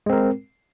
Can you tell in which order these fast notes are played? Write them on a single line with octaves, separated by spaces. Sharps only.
G#3 C4 A#4